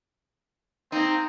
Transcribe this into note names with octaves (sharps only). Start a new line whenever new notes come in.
A#3 C4 D#4 A#5